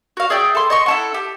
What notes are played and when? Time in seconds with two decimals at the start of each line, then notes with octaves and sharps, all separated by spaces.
0.17 F#4 F5
0.30 G#4 D5 E5 G5
0.55 A4 C6
0.70 D#5 C6 C#6
0.86 E4 A4 F#5
1.14 G4